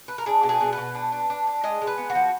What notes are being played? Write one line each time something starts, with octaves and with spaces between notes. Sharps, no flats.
B4
A#4
D4 G#4
B2
G#4
B2
B2 B4
D4
D4
D4
D4
G#3 D#5
G#3
B4
B3
F#4
F3